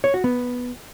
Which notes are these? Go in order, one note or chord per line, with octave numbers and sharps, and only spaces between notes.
C#5
F#4
B3